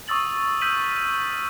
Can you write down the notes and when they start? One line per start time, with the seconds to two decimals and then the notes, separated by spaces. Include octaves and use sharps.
0.08 C#6 D#6 E6 A6 F#7
0.61 E6 F6 G6 B6 D#7 F#7